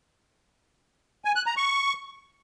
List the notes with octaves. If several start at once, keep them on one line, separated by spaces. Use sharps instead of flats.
G#5
F#6
A#5
C#6